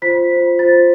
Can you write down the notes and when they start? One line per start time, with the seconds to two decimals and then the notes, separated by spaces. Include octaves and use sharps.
0.02 F4 C5 B6
0.31 F4 C5
0.59 F4 C5 A6